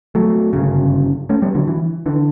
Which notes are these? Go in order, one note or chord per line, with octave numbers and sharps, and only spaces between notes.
F#3 A3
G1 F#2 C#3
A3 C#4
G3 B3
D3 F#3
E3
D3 E3